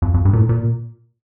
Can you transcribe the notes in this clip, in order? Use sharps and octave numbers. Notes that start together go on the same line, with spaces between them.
F2
F2
G2
A#2
A2
A#2